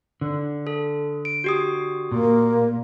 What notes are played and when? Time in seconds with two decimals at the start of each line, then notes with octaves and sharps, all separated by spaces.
0.21 D3
0.67 A4
1.25 D7
1.44 F#4 G4 D#6
2.12 A#2 A#3